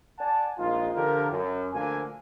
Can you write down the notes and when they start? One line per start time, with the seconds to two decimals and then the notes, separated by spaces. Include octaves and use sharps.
0.19 D5 F#5 G#5 A5
0.58 A#1 G#3 D#4 F4
0.96 D3 F3 D4 F4 G4 A#4
1.31 F#2
1.74 D2 D3 F3 A#3 G#5